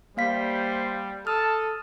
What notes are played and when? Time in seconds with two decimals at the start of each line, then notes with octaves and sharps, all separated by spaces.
0.17 G3 A#3 C5 F5 B6
1.27 A4 A5 D#6 F6